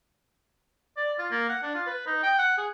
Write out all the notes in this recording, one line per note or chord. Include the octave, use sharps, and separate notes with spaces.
D5
F4
A#3
F#5
D4
F4
B4
D#4
G5
F#5
G#4